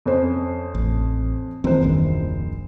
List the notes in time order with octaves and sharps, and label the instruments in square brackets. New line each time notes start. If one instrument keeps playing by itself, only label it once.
[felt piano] F2 C#4 C5
[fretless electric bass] A1
[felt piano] F#1 C5 [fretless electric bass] D#3 E3 C4
[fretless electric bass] D#1 A#1 D#3